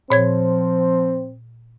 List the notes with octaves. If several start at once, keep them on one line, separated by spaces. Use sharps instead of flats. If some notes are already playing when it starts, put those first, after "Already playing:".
A#2 F3 C4 C#5 G#6